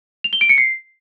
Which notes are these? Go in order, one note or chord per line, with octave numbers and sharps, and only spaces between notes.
F7
G7
D7
C#7
C7